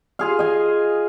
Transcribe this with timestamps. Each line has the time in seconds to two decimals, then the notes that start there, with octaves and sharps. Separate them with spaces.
0.19 F4 G#4 F5
0.39 D#5 G#5